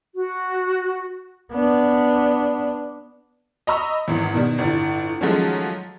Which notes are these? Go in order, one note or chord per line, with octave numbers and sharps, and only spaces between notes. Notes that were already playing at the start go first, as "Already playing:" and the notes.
F#4
B3 D4
D#5 A#5 B5 C#6 E6
G#1 E2
B2 D#3 G3
G1 A2 A6
D#3 F3 F#3 G#3 A3 C#4